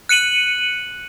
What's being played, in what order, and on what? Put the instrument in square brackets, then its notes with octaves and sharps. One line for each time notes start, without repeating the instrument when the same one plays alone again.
[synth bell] F#6 C#7 D#7 F#7